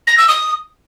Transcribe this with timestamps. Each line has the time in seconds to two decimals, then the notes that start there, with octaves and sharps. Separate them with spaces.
0.07 A#6
0.18 E6
0.28 D#6